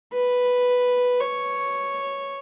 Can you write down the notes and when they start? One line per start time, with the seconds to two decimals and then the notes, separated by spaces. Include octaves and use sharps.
0.13 B4
1.20 C#5